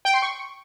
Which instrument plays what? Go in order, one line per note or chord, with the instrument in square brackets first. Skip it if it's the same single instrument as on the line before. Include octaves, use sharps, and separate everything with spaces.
[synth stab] G5
C6
C#6